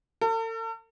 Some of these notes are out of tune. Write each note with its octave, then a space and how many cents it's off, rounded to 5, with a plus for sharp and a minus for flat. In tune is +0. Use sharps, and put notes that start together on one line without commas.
A4 +45